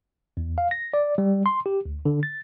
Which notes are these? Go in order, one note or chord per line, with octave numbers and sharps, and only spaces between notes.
E2
F5
A#6
D5
G3
C6
G4
D2
D3
A6